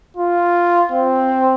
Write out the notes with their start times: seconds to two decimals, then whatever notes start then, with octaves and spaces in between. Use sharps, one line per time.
0.17 F4
0.92 C4